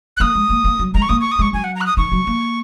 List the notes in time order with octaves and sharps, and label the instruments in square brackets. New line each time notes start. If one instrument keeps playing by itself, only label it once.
[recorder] F#6
[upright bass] A#3 [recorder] D#6
[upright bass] G#3
A#3
A#3
F#3
[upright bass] G#3 [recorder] A#5
[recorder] C#6
[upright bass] A#3 [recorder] D#6
[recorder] C#6
D#6
[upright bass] G#3 [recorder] C#6
[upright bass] F#3 [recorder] G#5
[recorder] F#5
A#5
F#6
D#6
[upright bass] D#3 [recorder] C#6
[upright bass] F#3
A#3